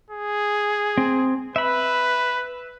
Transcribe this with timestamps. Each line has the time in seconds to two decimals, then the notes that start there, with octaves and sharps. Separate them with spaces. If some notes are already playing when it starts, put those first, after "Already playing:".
0.10 G#4
0.98 C4
1.56 B4 E5 B5